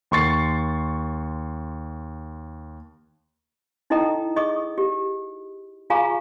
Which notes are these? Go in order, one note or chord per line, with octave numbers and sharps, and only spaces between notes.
D#2 C6 C#6 A6 C7
D#4 E4 A4 D#5 G5 A#5
G#4 D#5 C#6 D#6
G4
F4 G#4 F5 G#5 A#5 C#6